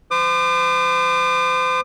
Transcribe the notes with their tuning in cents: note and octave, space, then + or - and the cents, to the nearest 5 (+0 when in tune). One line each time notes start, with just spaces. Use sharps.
C5 -40 D6 +40